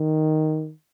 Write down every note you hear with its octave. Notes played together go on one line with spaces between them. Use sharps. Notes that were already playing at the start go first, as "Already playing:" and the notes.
Already playing: D#3